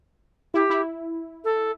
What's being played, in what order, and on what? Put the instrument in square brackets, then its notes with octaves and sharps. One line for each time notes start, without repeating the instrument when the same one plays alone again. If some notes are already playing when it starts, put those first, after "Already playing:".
[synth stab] E4 [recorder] G4
[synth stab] E4
[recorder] A4